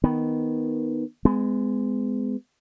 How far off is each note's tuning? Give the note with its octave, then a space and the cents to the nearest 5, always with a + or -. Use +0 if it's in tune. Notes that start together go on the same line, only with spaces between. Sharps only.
D#3 +0 B3 +0
G#3 +0 B3 +40